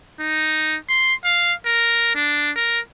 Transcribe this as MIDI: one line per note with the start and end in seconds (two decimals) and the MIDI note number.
0.20 0.76 63
0.90 1.13 84
1.25 1.53 77
1.66 2.15 70
2.16 2.51 62
2.56 2.79 70